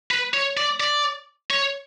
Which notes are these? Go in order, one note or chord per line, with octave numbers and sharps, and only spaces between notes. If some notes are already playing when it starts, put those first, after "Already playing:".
B4
C#5
D5
D5
C#5